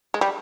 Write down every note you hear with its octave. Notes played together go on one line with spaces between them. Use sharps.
G#3
G3